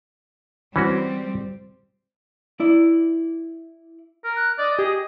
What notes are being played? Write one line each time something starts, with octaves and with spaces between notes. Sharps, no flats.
E3 G3 C4 C#4 F#4
E4 D5
A#4 F6
F#6
D5 D#5
G4 G#4